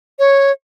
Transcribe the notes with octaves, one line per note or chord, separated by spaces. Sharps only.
C#5